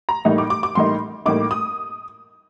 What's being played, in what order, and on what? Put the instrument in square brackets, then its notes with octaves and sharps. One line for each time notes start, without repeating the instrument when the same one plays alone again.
[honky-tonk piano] A#5
A2 G3 A#3 D#4
D6
D6
D6
A2 G3 A#3 D#4 C6
A2 G3 A#3 D#4 D6
D#6